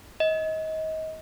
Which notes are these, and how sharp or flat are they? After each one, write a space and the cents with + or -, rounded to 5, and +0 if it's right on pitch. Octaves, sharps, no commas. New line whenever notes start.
D#5 +30